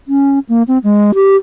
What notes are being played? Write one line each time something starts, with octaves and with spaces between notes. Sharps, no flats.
C#4
A#3
C4
G#3
G4